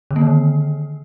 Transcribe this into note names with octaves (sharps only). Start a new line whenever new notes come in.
D3
A#3
D#3
D3